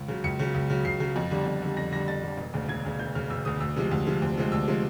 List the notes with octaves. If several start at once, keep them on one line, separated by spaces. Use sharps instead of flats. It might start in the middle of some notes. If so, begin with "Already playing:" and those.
Already playing: C#2
C#3 F#3
C#2 C#7
C#3 F#3
C#2
C#3 F#3
C#2 C7
C#3 F#3
F2
D3 G3
F2
D3 G3
F2 A#6
D3 G3 A#6
F2 A6
D3 G3
E1
D2 C#3
E1 G#6
D2 C#3
E1 G6
D2 C#3 F6
E1 E6
D2 C#3 D#6
D2 E6
C3 F3 G#3
D2
C3 F3 G#3
D2
C3 F3 G#3
D2 E6
C3 F3 G#3